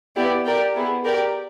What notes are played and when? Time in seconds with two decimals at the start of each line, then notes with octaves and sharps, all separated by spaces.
0.16 B3 E4 G4 B4 D5
0.45 G4 A#4 D5 G5
0.75 B3 E4 G#4
1.05 G4 A#4 D5 G5